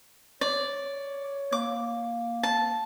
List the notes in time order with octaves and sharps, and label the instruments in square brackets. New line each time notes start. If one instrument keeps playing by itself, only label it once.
[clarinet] C#5 [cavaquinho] D5
[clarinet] A#3 [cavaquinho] D6
[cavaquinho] A5